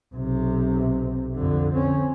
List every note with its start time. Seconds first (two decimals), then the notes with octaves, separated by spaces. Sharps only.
0.14 B1 C3
1.35 F2 D3
1.73 C4 C#4